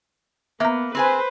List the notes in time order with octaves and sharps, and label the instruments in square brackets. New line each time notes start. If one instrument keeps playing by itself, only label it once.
[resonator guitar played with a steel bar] A#3 [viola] B3 [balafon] E5 A#5
[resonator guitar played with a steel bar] C4 G#4 G#5 [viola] B4 C5